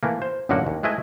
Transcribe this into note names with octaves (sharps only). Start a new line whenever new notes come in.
E3 A3 A#3
C5
A1 F#2 D3 A#3 F#4 F#5
D#2
G#3 A3 E4 B4 D#5 G#5